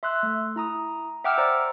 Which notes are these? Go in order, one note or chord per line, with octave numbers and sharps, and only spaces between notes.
E5 C6 E6 F#6
A3
E4 A#5 D#6
E5 F#5 G5 D6 E6 F6
C5 D5 A#5